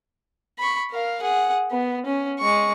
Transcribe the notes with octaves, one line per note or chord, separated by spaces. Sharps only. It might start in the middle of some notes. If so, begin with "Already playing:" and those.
B5 C#6
A#4 F5
G#4 F#5
B3
C#4
G#3 C#6